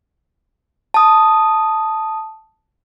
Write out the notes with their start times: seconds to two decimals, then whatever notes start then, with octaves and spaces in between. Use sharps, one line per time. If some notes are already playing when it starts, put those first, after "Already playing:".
0.94 A5 D#6